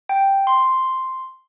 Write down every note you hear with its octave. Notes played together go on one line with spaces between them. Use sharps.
G5
C6